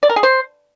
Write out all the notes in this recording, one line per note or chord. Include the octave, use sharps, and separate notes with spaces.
D5
A#4
G#4
C5